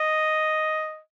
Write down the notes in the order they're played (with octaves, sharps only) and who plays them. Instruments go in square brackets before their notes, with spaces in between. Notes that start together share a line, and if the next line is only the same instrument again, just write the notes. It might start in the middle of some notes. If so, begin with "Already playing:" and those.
Already playing: [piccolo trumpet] D#5